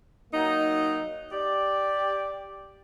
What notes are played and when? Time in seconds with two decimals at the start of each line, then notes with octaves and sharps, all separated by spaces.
0.33 F#3 A#3 D#4
1.32 G4 D5